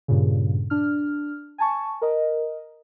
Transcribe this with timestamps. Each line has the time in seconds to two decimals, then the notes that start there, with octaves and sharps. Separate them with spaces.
0.08 G2 A#2 C#3
0.70 D4 F6
1.58 G#5 A5 C#6
2.02 A#4 D#5